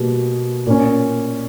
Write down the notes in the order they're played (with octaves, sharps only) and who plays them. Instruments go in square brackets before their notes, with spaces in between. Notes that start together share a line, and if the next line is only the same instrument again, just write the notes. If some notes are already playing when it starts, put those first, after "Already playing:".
Already playing: [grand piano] B2 G3 A#3
A#2 A#3 C#4